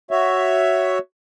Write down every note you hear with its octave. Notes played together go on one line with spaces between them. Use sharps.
F#4 C#5 E5